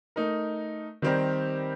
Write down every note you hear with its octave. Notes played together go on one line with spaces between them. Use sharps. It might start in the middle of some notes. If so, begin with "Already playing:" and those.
A3 D#4 A#4
D#3 G3 C4 G4 A#4